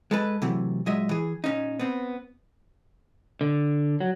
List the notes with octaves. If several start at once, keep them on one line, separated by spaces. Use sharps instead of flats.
G#3 A4 B4
C3 E3 F#3 A3
A#2 F#3 G#3 D#5 E5
E3 G#4
A#2 C#4 D#4
B3 C4
D3
F#3